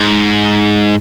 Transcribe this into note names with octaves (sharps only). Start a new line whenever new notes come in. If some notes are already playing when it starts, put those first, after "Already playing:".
Already playing: G#2